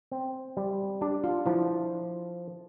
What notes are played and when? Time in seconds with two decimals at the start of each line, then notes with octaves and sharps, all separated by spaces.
0.12 C4
0.57 G3
1.01 D4 G4
1.24 F4
1.46 F3 E4